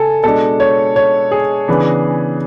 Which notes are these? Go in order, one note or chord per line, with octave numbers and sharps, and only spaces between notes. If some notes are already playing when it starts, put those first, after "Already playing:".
Already playing: C#3 A4 G#5
B2 G#3 D4 A4
C#5
C#5
G#4
C#3 E3 B3 D4